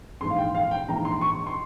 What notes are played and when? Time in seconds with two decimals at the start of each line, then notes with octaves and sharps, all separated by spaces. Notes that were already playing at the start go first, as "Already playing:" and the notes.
0.21 A#1 G#2 E3 C6
0.30 F5
0.38 G5
0.55 F5
0.71 G5
0.88 A#1 G#2 E3 A#5
1.05 C6
1.21 C#6
1.47 C6